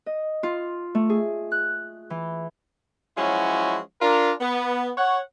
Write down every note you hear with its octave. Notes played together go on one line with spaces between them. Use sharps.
D#5
F4
A3
G#4
F#6
E3
F3 F#3 G#3 C#4 E4 F#4
D4 F4 A#4
B3
C#5 F#5